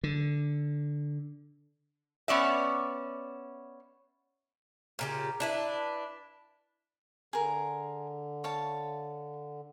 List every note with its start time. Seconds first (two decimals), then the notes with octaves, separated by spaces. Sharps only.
0.04 D3
2.28 B3 C#4 D5 E5
4.99 A#2 C#3 G4
5.40 D4 E4 B4
7.33 D3 G#4 A#4
8.44 C#5 F5 A5